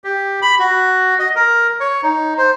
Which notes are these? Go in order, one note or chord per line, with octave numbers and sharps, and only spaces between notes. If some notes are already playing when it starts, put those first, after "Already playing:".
G4
B5
F#4
D#5
A#4
C#5
D#4
C5